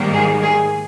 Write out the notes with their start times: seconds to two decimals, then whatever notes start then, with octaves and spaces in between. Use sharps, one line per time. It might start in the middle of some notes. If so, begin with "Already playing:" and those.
Already playing: G#2 D#3 G3 A#3
0.12 G#4
0.41 G#4